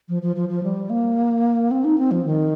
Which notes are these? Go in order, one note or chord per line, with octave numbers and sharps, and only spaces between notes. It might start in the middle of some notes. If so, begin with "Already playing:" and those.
F3
F3
F3
F3
G3
A#3
C4
D#4
C4
F3
D#3